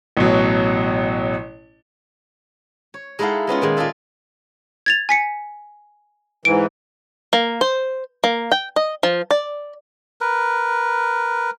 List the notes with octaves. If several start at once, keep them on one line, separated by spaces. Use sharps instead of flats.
A1 B2 F#3
C#5
G#3 D#4 E4 A4 F5 F#5
G#3 B3 C#4 F4
A#2 D#3 G#3
F4 G#4 A4 D5 E5
G#6 A6 F7
G#5 B6 C#7
G#2 E3 D7
A#3
C5
A#3
G5
D#5
F3
D5
A#4 B4